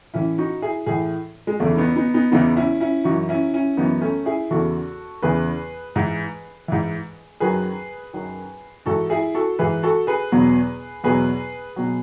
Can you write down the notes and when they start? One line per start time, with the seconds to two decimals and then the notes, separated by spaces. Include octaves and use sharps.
0.14 A2 E3 C#4 E4
0.38 D#4 F#4
0.62 E4 G#4
0.86 A2 E3 E4 G#4
1.47 G#3
1.60 E2 C#3 E3 A3
1.77 B3 D#4
1.96 B3 D#4
2.14 B3 D#4
2.32 E2 C#3 E3 B3 D#4
2.56 C#4 E4
2.80 C#4 E4
3.04 F#2 E3 D#4 F#4
3.29 C#4 E4
3.53 C#4 E4
3.77 F#2 E3 B3 D#4
4.01 A3 C#4
4.26 E4 G#4
4.51 E2 C#3 E3 F#4 A4
5.22 E2 C#3 E3 G#4 B4
5.96 G#2 E3
6.68 G#2 E3
7.40 F#2 D#3 F#3 G#4 B4
8.14 F#2 D#3 F#3
8.86 G#2 E3 F#4 A4
9.10 E4 G#4
9.34 F#4 A4
9.59 G#2 E3 G#4 B4
9.83 F#4 A4
10.07 G#4 B4
10.32 E2 B2 F#3
11.04 E2 B2 F#3 G#4 B4
11.76 B2 F#3